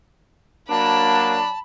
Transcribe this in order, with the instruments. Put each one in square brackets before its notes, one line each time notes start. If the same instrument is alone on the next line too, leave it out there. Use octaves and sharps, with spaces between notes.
[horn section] F#3 D4 [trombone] A#3 [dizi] A5 [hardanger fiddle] B5